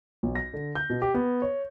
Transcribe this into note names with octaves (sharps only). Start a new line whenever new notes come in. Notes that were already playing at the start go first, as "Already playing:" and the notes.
B1
A#6
D3
G6
B2
G4
B3
C#5